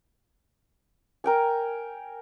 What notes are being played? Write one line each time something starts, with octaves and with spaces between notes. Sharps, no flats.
A#4 G5 G#5